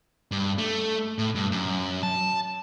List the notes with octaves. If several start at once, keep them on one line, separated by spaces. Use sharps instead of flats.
G2
A3
A2
G2
F#2
A5